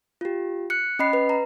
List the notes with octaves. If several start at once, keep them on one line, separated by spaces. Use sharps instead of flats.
F4 G4
F#6 C#7
C#4 D#5 B5 C7
B4
A#5